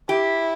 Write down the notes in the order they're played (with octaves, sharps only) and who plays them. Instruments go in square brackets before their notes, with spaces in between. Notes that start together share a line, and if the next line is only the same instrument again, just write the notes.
[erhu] E4 [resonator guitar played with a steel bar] G4